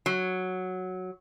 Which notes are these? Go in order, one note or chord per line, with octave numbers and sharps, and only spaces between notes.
F#3